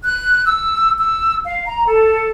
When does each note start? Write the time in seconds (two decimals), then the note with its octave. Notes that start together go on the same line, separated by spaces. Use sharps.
0.04 F#6
0.45 E6
0.97 E6
1.45 F5
1.66 A#5
1.87 A4